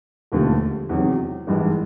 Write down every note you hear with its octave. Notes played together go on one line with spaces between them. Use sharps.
E1 D#2 D3 F3 A3
E2 C3 D#3 F#3
G#1 G2 E3 G#3